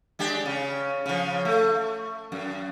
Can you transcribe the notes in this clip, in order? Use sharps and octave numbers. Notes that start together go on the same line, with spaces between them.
G#3 D4 G4
C#3
C#3 F3
A3
F#2